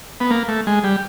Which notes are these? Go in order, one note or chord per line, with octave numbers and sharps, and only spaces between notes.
B3
A#3
A3
G#3
G3